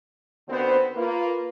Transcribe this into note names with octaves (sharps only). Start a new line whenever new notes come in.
D#2 D3 B3 C4 F#4 C5
A#3 F4 B4